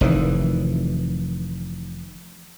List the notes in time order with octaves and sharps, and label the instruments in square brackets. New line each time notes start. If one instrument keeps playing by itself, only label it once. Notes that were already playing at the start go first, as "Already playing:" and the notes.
[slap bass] F1 D#3 E3